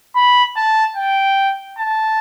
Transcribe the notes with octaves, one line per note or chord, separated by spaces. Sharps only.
B5
A5
G5
A5